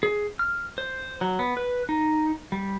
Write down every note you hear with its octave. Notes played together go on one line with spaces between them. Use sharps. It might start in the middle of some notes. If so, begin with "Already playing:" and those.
G#4
F6
C5
F#3
B3
B4
D#4
G3